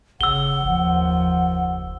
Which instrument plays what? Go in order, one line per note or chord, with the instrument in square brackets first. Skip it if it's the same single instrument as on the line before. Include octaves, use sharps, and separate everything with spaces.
[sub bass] G1 [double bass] C#3 [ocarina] F#5 [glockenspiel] E6 G7
[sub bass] F#1 [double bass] D#2 F3